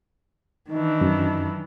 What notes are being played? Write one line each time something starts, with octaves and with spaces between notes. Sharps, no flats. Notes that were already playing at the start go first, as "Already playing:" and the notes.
D#3 E3 D4 D#4
F#2